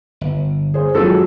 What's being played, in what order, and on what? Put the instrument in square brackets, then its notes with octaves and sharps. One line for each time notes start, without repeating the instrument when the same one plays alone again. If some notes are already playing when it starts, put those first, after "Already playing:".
[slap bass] G1
[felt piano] G#4 C5
[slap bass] F#2 D#3 [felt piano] F3 F#3 G#3 [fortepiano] A4